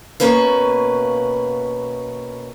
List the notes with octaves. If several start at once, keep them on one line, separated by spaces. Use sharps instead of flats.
B2 A#3 C#4 B4 F5